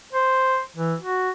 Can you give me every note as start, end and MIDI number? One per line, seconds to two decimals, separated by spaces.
0.13 0.63 72
0.77 0.95 52
1.00 1.31 66